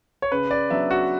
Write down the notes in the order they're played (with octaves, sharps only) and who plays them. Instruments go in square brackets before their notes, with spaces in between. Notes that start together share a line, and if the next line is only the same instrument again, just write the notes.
[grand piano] C#5
C#3 B4
D5
F#3 B3 D4 E5
F#4